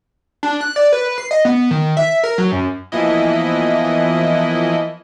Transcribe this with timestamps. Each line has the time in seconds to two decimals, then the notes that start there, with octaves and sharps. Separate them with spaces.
0.43 D4
0.61 F#6
0.76 D5
0.92 B4
1.18 C7
1.31 D#5
1.45 B3
1.71 D#3
1.97 E5
2.23 A#4
2.38 F#3
2.52 F#2
2.92 E3 F3 A#3 B3 E4 D#5